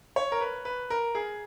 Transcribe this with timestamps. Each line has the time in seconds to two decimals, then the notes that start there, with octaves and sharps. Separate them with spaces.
0.16 C#5
0.32 A#4
0.41 B4
0.65 B4
0.90 A#4
1.15 G#4